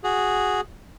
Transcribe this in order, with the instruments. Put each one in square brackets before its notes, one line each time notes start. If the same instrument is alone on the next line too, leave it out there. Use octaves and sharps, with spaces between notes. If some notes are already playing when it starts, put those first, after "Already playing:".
[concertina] F#4 G#4